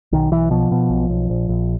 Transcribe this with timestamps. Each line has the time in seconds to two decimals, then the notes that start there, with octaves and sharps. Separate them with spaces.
0.12 B1 D#3
0.31 B1 E3
0.51 B2 F3
0.72 B2
0.90 B1
1.09 B1
1.30 A#1
1.49 A#1